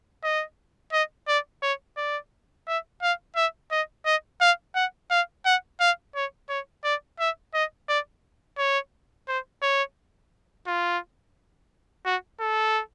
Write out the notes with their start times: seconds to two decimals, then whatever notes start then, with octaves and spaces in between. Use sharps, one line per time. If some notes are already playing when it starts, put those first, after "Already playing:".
0.23 D#5
0.92 D#5
1.28 D5
1.62 C#5
1.97 D5
2.67 E5
3.02 F5
3.36 E5
3.71 D#5
4.05 D#5
4.41 F5
4.75 F#5
5.10 F5
5.45 F#5
5.80 F5
6.15 C#5
6.49 C#5
6.84 D5
7.19 E5
7.54 D#5
7.88 D5
8.58 C#5
9.28 C5
9.62 C#5
10.67 F4
12.06 F#4
12.40 A4